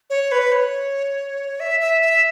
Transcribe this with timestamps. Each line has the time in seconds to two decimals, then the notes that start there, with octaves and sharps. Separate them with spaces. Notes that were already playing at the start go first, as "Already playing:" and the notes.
0.10 C#5
0.32 B4
0.52 C#5
1.60 E5
1.80 E5
2.02 E5